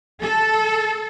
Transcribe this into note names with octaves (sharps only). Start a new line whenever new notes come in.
A4